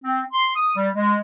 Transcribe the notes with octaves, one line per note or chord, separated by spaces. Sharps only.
C4
C6
D#6
G3
G#3